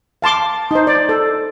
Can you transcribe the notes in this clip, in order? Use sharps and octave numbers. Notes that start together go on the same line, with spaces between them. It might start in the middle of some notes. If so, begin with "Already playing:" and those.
F5 A5 C6 D6
D#4 C5
D5
A4